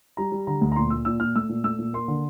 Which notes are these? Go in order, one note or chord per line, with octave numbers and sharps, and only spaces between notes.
G3 A#5
G3
D3 A#5
D2
A#5
A#2 C6
A#2 E6
A#2 E6
A#2 F6
A3 E6
A#2
A3 E6
A#2
A#3 C6
D3